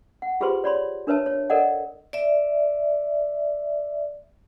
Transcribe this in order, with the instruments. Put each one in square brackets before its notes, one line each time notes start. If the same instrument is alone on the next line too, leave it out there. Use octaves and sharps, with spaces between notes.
[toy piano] F#5
F4 G4 G#4 B4 C5 C6
C#5 D5 B5 C6
D4 A#4 B4 C#5 E5 A5
C#5
A4 A#4 D5 D#5 F#5
[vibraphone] D5 E5